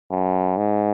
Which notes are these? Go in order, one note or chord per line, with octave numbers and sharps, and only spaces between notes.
F#2
G#2